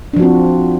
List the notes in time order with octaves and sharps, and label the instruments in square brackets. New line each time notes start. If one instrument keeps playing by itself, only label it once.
[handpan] D4
F3
F#4
C4